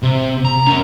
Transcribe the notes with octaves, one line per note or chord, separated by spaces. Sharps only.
C3
A#5
C#4 A#4